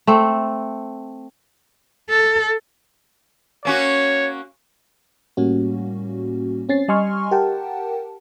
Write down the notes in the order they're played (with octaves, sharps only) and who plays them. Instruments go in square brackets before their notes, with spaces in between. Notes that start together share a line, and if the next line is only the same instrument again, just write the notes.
[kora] A3 C4
[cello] A4
[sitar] A#3 C#4 F#4 [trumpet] C#5
[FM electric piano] A2 G3 A#3 C#4 F#4
C4 C#4 A6 C7
G3 D#5 G#5 C6 C#6 F6
G4 A#4 F#5 G5 A5